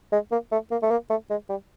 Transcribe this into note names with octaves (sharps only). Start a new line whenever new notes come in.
G#3
A#3
A3
A#3
A3
A#3
A3
G#3
G3